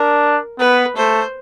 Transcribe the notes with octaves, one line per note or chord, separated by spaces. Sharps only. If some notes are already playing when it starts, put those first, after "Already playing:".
Already playing: D4 A#4
B3 B4
A3 C5